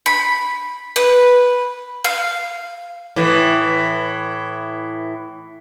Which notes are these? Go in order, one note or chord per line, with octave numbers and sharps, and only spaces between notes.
B5
B4
F5
A2 E3